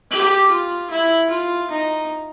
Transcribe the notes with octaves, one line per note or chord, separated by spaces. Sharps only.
G4
F4
E4
F4
D#4